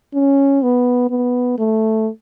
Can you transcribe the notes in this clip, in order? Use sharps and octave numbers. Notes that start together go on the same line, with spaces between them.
C#4
B3
B3
A3